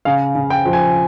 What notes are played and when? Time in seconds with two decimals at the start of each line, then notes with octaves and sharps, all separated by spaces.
0.05 C#3 F5
0.35 C#3
0.50 G5
0.65 F3
0.73 G#5